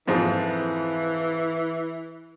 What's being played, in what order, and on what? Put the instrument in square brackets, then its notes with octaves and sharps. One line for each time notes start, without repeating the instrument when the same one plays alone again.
[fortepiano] F2 G#2 [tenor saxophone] E3